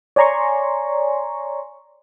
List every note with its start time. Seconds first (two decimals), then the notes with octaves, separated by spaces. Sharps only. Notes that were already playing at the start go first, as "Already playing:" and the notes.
0.16 C#5 D5 G#5 A#5 C6 C#6